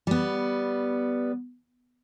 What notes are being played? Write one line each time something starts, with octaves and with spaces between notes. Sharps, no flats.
G3 B3